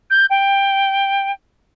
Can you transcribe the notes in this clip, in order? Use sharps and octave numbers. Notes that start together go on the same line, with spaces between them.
G6
G5